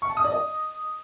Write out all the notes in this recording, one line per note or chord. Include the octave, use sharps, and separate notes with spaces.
C#6
A5
D#6
D5
D#5